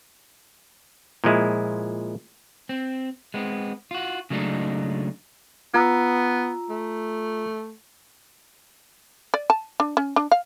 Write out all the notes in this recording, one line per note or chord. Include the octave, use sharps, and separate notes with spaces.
A#2 F3 G#3 E4
C4
G#3 B3 C4
F4 F#4
C#3 F#3 G#3 A3 D4 D#4
B3 F4 A#5 E6
A3
D5
A5
D4
C#4
D4
F5